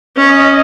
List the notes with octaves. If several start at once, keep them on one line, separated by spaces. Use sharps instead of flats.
C#4 D#5